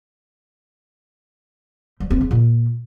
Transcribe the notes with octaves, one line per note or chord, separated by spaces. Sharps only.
G3
C4
C#3
A#2